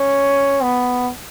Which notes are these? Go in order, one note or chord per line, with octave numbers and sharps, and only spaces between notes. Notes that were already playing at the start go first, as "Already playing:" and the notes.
Already playing: C#4
B3